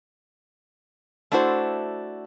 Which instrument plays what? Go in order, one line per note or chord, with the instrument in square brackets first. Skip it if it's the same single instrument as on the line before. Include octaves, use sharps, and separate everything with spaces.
[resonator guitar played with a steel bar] A3 D4 E4 F#4 C5